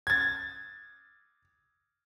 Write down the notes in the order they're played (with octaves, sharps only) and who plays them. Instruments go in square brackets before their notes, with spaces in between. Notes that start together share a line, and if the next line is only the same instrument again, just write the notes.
[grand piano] G#6 A6